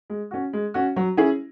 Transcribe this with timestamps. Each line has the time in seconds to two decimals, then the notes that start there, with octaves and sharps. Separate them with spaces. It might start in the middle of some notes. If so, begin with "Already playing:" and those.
0.10 G#3
0.31 C#4 F#4
0.53 G#3
0.74 C#4 F#4
0.96 F#3
1.17 C#4 E4 G#4